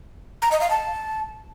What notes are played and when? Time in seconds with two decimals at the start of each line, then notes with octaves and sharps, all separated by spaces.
0.42 A#5
0.52 D#5
0.61 F5
0.70 A5